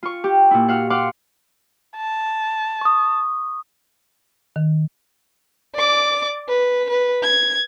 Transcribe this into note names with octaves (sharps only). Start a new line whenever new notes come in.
F4 C#6
G4
A#2 E4
F#4 F5 F#5
F5 F#5 C6 D6
A5
C#6 D#6
D#3
D5 D6
B4
B4
G#6